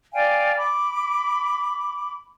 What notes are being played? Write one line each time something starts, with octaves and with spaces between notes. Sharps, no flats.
D5 F5 G5 G#5
B5 D6